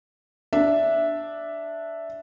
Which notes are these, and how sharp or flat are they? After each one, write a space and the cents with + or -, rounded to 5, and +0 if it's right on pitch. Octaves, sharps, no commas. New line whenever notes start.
D4 +0 E5 +0